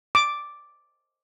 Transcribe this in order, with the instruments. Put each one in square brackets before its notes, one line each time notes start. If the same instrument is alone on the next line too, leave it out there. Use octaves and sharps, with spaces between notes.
[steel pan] D6